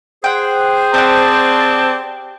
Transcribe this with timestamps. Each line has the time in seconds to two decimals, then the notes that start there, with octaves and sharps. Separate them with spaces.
0.24 G#4 C5 F#5 G5
0.94 C4 G4 D5 F#5 A5